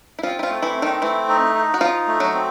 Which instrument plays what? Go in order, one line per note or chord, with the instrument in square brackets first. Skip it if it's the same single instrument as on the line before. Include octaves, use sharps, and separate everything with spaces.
[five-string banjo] E4
[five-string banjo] F3 F4 [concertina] C4
[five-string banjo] E4
F3 F4
[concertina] A3
[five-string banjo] E3 E4
[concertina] C4
[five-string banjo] D#3 D#4
[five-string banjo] E3 E4 [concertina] A3
[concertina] D#4
D#4
[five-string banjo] F#4
[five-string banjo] F3 F4 [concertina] D#4
[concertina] A3
[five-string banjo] F#3 F#4
[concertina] C4